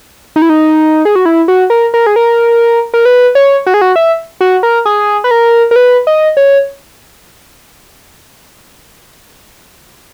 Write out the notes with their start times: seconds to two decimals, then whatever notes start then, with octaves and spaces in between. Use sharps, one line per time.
0.36 D#4
0.42 E4
0.50 D#4
1.05 G#4
1.16 F#4
1.26 E4
1.48 F#4
1.70 A#4
1.94 A#4
2.07 G#4
2.16 A#4
2.94 A#4
3.05 B4
3.35 C#5
3.67 F#4
3.74 G#4
3.81 F#4
3.96 E5
4.41 F#4
4.63 A#4
4.86 G#4
5.24 B4
5.31 A#4
5.71 A#4
5.76 B4
6.07 D#5
6.37 C#5